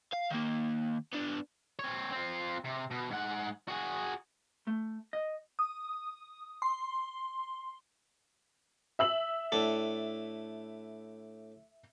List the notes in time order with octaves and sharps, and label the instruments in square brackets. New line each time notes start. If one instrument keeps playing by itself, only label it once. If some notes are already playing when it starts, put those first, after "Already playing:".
[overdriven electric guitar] F5
D#3 A#3
B3 D4
[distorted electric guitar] C4 C#5
C4 F4
C3
B2
G#2 F#5
F#4 G#4
[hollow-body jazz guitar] A3
D#5
[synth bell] D#6
C6
[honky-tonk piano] E5 E6 F#7
[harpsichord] A2 D4 A4